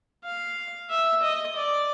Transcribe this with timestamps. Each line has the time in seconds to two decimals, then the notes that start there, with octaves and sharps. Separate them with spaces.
0.24 F5
0.90 E5
1.22 D#5
1.56 D5